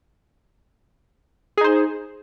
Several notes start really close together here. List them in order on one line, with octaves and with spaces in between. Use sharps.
G#4 D#4 C5